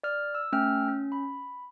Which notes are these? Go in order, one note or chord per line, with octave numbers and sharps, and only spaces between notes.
D5 F6
E6
A3 C#4 G5 E6 F6
C#4
B5